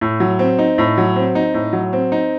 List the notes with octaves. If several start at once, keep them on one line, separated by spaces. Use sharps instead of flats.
A2
F#3
C4
D#4
A2
F#3
C4
D#4
A2
F#3
C4
D#4